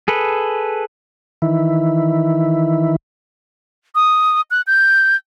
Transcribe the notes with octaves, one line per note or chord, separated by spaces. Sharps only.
G#4 A4 B4
D#3 E3 E4
D#6
F#6
G6